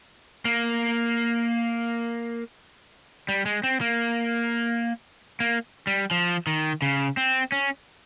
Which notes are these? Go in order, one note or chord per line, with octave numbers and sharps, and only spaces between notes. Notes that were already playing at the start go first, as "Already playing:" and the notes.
A#3
G3
G#3
C4
A#3
A#3
G3
F3
D#3
C#3
C4
C#4